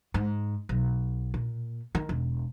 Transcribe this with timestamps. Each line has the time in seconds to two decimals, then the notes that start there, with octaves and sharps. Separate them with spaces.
0.14 G#2
0.69 B1
1.34 A#2
1.95 D#3
2.09 E1